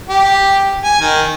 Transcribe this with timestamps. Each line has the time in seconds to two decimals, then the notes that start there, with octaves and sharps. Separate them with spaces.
0.09 G4
0.84 G#5
1.01 D#3